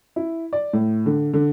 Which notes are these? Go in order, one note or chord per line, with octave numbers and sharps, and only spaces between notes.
E4
D5
A2
D3
D3